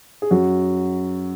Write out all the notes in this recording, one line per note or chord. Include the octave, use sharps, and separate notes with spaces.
G#4
F#2 F#4